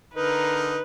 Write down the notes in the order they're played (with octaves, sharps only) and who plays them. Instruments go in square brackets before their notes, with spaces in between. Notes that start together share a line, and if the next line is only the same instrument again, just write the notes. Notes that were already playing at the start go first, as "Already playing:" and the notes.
[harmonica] D3 D#4 A#4 [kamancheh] B4